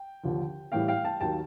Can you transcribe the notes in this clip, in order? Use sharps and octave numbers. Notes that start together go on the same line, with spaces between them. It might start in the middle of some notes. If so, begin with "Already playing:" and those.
Already playing: G5
D#2 D3 F3
A2 E3 G3 F5 G5
F5 G5
G5 A5
D#2 D#3 F#3 G5 A5